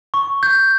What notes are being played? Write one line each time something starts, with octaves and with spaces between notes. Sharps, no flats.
C#6
G6